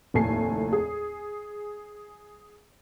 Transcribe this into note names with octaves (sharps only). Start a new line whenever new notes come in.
F1 D#2 A2 A4 G#5 C7
G#4